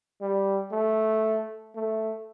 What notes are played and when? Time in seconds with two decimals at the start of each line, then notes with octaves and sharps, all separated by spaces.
0.21 G3
0.72 A3
1.75 A3